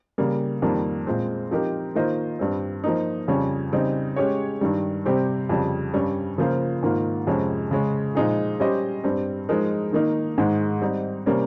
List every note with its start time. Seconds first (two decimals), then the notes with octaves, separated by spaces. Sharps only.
0.18 C#3 G3 A#3
0.62 F2 D#3 G3 A#3
1.07 A#2 G#3 C4
1.51 F3 C4 D#4 G4 A#4
1.95 D#3 A#3 F4 C5 D#5
2.39 G2 G3 C4
2.84 F3 A#3 D#4
3.28 F2 C#3 G3 C#4
3.73 C#3 G3 C4 D#4
4.16 G#3 C#4 G4 C#5
4.61 G2 D#3 G3
5.05 C3 G3 C4 G4 C5
5.49 F2 C#3 G3
5.94 G2 G3 C#4
6.38 C#3 F3 A#3 F4 C5
6.83 G#2 D#3 A#3 F4
7.27 F2 C3 F3 G#3 C#4
7.71 C#3 G#3 C#4
8.15 A#2 F3 G#3 D#4 G#4
8.60 G3 C#4 G4 C5 D#5
9.04 G2 G3 C4
9.49 F3 G#3 D#4 A#4
9.93 D#3 A#3 D#4
10.38 G#2 D#3 G#3
10.81 G3 C4 D#4
11.26 C3 G3 A#3 C#4